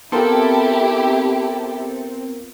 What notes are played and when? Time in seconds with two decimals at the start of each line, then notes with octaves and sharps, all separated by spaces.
0.12 B3 C4 E4 F4 G4 A4 A#4